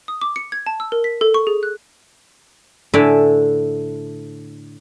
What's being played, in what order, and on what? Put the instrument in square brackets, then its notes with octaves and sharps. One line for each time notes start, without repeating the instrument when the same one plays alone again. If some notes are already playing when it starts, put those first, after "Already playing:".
[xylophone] D#6
D6
C#7
G#6
A5
E6
A#4
B6
A4
C#6
G#4
F#6
[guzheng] A2 D3 D5 E5 G#5 A5